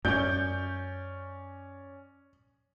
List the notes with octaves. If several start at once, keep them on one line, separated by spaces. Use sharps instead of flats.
F#2 C#4 D5 G6